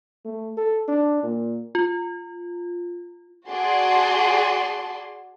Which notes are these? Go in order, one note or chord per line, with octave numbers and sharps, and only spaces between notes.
A3
A4
D4
A#2
F4
F#4 G#4 D5 A5 C6